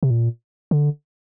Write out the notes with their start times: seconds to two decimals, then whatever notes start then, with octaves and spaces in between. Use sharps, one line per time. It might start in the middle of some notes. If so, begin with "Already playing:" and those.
0.03 C3
0.10 A#2
0.71 D3